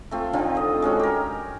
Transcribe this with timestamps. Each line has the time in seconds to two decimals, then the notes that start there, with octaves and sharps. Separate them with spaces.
0.11 A3 C4 F4
0.33 D3 D#3 C4 F4
0.55 C5 D#5
0.82 G#3 C#4 F#4 A4
0.99 G4 A#4